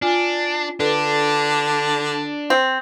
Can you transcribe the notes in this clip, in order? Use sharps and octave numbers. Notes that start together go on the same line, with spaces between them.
D4 F4 G#5
D3 D4 A4 B4
C4